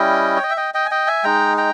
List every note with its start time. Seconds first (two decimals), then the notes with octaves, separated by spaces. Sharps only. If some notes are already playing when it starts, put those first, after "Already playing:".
Already playing: G3 C#4 E4 D#5 G5
0.36 C#5
0.43 D#5
0.50 E5
0.57 D#5 G5
0.74 D#5 G5
0.85 G#5
0.91 D#5 G5
1.07 E5 G#5
1.24 G#3 D#4 G5 A#5
1.57 G5 A#5